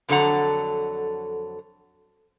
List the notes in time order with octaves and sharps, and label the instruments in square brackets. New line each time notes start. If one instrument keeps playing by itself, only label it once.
[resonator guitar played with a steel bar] F2 D3 F#3 A4 F#5 A#5